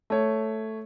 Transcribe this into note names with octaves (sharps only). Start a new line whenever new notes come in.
A3 C#5